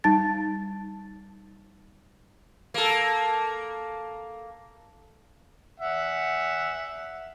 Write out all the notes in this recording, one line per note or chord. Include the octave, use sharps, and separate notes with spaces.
G3 D#4 A5 A6
A#3 A4
E5 F#5